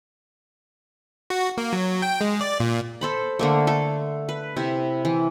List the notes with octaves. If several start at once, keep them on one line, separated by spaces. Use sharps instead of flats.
F#4
A#3
F#3
G5
G#3
D5
A#2
A4 C5 B5
D3 A3 A#3
A3 A4
B4
C3 E4
E3